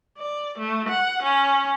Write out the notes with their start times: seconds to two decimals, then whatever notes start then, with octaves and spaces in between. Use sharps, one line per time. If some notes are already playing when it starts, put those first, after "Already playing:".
0.18 D5
0.59 A3
0.89 F#5
1.23 C#4